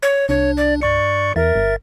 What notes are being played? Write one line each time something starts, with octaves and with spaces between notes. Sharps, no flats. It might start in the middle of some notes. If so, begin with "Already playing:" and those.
C#5
C2 D4 C#5
D5
G2 D5 C#6 C#7
E2 A#4 E5 A6
G1